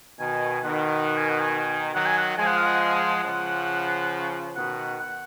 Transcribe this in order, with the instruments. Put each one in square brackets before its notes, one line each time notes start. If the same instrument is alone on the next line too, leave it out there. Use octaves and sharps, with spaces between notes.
[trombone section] B2 D#3 [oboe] G#5
[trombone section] B2 D#3 [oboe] F#5
[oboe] F#5
G#5
F#5
G#5
[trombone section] D#3 F#3 [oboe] F#5
[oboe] G#5
F#5
[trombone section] F3 G#3 [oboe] G#5
[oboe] F#5
F5
F#5
F#5
[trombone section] C#3 F3
[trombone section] B2 D#3 [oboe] F#5
[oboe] F#5